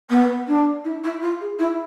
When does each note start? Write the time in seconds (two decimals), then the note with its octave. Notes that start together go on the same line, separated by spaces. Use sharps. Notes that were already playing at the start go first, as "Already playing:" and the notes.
0.09 B3
0.47 D4
0.84 E4
1.03 E4
1.21 F4
1.40 G#4
1.58 E4